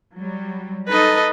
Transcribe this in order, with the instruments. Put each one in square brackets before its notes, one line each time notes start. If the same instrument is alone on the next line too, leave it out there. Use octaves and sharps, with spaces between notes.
[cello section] F#3 G3
[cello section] D#4 A4 [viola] B4 D#5